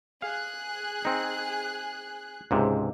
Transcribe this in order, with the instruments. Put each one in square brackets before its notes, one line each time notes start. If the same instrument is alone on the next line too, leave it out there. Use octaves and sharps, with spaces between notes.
[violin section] G#4 F#6 [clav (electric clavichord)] F5
[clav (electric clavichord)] C4 D#4
C#2 G#2 C3